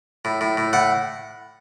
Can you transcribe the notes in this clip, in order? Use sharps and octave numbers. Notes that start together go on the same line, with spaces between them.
A2
A2
A2
A2 F#5